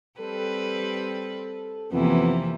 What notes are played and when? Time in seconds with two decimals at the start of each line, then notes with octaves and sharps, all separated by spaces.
0.20 G3 C4 A4 B4
1.92 F2 C3 E3 A#3 B3